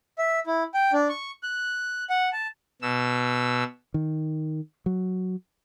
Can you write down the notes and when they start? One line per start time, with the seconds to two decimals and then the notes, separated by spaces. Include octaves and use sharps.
0.18 E5
0.47 E4
0.74 G5
0.93 D4
1.10 C#6
1.43 F#6
2.10 F#5
2.33 A5
2.82 B2 E6
3.94 D#3
4.86 F#3